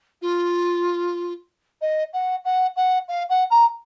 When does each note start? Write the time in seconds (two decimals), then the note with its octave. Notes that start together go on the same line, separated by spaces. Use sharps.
0.22 F4
1.81 D#5
2.13 F#5
2.45 F#5
2.76 F#5
3.08 F5
3.29 F#5
3.50 A#5